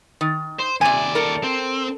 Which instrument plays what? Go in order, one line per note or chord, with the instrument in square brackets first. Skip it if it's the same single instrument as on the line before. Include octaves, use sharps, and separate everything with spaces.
[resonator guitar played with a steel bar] D#3
[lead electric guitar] C5
[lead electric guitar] D#2 D5 [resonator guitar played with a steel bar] C3 G#5
[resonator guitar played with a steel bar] A4 A#4
[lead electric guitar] C4